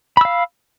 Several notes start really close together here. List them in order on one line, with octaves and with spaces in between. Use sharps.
B5 E6 F5